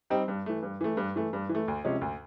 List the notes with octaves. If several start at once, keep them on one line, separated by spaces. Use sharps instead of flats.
G3 C4 D#4
G2
E3 A3
G2
E3 A3
G2
E3 A3
G2
E3
A3
D2
C3 F3 G#3 C#4
D2